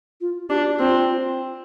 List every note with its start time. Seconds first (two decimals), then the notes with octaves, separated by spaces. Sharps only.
0.21 F4
0.49 D4 G4
0.57 F4
0.63 G4
0.79 C4 F4